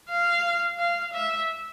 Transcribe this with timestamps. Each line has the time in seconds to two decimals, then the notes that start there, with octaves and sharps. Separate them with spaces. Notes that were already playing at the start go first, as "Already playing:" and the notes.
0.09 F5
0.78 F5
1.13 E5